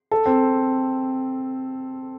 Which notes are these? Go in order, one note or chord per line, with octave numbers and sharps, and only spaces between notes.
A4
C4